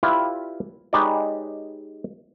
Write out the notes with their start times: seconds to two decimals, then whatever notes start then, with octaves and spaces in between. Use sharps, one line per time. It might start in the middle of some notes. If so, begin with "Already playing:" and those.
0.03 E4 F4 G4 B4 D5 E5
0.93 G#3 D#4 G4 B4 C#5 D5